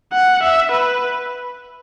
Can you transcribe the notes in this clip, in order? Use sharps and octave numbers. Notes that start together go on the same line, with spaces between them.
F#5
E5
B4